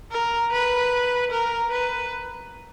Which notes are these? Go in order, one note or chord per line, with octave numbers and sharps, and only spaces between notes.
A#4
B4
A#4
B4